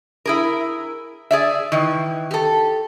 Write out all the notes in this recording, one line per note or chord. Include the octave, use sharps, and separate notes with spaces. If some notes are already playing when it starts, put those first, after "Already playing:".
E4 G#4 A#4
G#4 D5 E5
D#3 E3
G4 A4